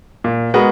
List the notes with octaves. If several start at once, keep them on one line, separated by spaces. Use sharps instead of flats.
A#2
G#3 B3 F#4 A#4